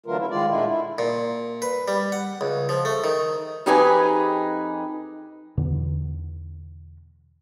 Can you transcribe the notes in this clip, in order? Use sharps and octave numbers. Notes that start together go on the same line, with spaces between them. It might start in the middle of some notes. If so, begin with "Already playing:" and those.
D3 E3 F#3 A3 F4 A#4
C#3 E4
D#3 G#3 F4 D5
A#2 D3 G#3 A3 E4 F4
E4
A#2
B4
G3
F#5
C#2
F3
A3
D#3
F2 D#4 G4 G#4 B4 G#5
E2 B2 D3